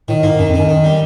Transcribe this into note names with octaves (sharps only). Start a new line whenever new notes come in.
A2 D#3
G#2 A#3
F#2 D#3
F2
F#2 D#3
D#3
G3